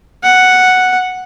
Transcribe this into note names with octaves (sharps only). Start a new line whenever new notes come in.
F#5